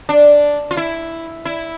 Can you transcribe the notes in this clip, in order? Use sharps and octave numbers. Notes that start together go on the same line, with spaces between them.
D4
F4
E4
E4